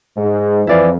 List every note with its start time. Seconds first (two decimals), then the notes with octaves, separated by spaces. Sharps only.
0.16 G#2
0.67 F2 E3 E4 D5 F5